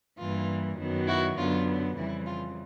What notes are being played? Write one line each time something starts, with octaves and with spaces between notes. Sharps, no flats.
G2 E3 G3 A#3 F4
F#2 D#3 F#3 B3
E4 F#4
F#2 D3 F#3 B3 F4
F2 C#3 E3 G3 E4
F4